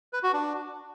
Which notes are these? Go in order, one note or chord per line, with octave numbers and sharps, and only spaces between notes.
B4
F#4
D4